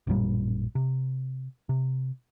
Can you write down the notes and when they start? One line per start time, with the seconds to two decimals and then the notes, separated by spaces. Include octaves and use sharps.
0.07 A1 F#2 A#2 G3
0.75 C3
1.69 C3